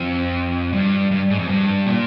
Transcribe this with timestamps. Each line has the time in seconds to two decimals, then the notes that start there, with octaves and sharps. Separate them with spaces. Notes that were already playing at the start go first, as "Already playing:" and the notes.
Already playing: F2
0.73 G2
1.11 G2
1.30 G#2
1.39 F2
1.49 G2
1.87 A#2